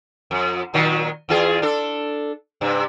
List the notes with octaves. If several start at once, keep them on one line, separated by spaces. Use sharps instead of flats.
F2
A#2 D#3 F#3
E2 F4 G#4
D4 A4
G2 C3